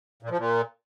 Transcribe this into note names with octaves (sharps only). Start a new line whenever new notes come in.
A#2
F3
A#2